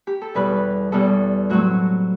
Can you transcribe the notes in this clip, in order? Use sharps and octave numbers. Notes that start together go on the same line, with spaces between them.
G4
A4
E2 B2 G3 B4
E2 B2 G3 A4
A2 F#3 A3 C4 F#4